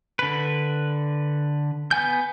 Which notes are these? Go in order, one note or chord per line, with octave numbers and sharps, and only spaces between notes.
D3 B4
B3 G#5 G6